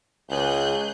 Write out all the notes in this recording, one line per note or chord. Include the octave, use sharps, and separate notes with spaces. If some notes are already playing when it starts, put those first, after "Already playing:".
C#2 G#4 F#6 G6